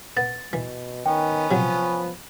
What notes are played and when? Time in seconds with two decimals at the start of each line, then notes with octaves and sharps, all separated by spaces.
0.17 B3 A6
0.53 B2 E3
1.06 D#3 B3 C#4 G5
1.51 C3 F3 F#3